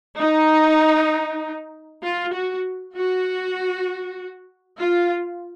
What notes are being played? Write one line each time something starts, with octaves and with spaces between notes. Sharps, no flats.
D#4
F4
F#4
F#4
F4